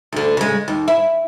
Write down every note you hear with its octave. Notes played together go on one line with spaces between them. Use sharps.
D2 D3
C#3 G#3
D#2
E4